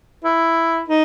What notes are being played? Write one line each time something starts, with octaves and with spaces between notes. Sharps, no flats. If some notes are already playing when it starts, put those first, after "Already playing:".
E4
D#4